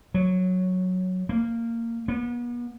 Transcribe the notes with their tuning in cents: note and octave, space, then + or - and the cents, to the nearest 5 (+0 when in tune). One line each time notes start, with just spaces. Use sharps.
F#3 -5
A#3 -15
B3 -40